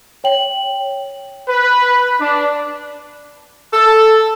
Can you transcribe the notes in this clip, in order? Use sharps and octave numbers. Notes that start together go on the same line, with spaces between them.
C#5 G5 F#7
B4
D4
A4